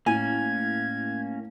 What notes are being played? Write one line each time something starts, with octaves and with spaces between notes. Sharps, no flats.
A2 A#3 C#4 G#5 G#6